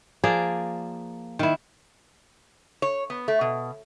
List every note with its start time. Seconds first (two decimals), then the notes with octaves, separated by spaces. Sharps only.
0.24 F3 A#3 G#4 D5
1.39 D#3 E4
2.82 C#5
3.10 B3
3.28 A3
3.41 B2